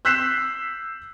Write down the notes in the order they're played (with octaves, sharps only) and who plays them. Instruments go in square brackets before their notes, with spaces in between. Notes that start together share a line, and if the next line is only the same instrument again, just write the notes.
[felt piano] E6 F#6 G6 B6 C7 E7